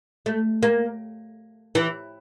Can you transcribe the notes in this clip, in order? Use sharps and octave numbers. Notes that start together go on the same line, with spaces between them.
A3
A#3
E3